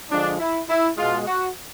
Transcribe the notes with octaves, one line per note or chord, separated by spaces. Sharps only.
D3 F3 G#3 D4
E4
E4
B2 G#3 F4
F#4